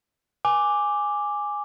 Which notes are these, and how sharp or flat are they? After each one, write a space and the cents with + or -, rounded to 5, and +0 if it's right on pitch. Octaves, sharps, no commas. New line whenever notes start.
G#5 -5 D6 +0